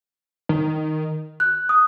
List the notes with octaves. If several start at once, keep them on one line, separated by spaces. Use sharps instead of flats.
D#3
F#6
D#6